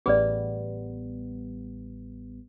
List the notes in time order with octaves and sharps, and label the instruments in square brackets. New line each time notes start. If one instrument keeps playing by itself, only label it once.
[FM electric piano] A1 G3 B3 [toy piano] G#4 B4 D5